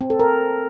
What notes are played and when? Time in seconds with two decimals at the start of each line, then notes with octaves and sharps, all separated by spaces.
0.01 C4
0.10 A4
0.20 A#4